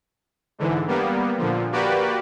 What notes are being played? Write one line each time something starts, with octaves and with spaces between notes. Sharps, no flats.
G#2 D3 E3
G3 A#3 B3
A#2 D3 F3
A#3 F#4 G4 B4 D5